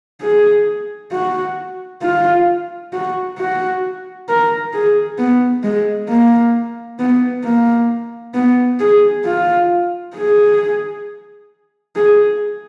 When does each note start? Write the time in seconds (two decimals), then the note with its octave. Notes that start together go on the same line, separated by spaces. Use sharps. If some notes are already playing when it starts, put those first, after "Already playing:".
0.22 G#4
1.12 F#4
2.02 F4
2.93 F#4
3.38 F#4
4.28 A#4
4.73 G#4
5.18 B3
5.63 G#3
6.09 A#3
6.99 B3
7.44 A#3
8.35 B3
8.80 G#4
9.25 F4
10.15 G#4
11.96 G#4